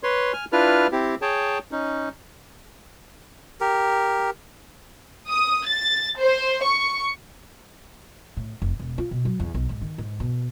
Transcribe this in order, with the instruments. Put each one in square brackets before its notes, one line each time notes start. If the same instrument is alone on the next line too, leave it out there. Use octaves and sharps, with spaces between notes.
[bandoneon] B4 C#5 C6
G#5 F6
D4 E4 F4 B4 F6
C4 E4 G4
G#4 C#5 G5 A5
C#4 D#4
[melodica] G4 A#4
[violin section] D#6
A6
C5
C#6
[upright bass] A2
F1
E1
F4
B2
F#3
E2
B1
G#2
D#3
G#2
B2